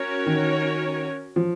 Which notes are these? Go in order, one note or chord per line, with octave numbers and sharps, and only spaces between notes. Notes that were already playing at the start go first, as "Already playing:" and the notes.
Already playing: C#4 F#4 A#4 C#5
D#3
F3